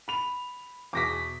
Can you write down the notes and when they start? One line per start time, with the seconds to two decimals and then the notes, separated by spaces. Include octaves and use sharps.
0.08 B5 F7
0.93 E2 B2 G#4 D6 A#6 B6